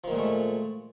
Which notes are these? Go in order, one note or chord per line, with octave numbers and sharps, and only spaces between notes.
A#2 D#3 F3 G#3 A3